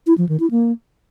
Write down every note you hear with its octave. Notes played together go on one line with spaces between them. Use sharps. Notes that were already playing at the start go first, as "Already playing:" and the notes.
E4
F3
D#3
E4
A#3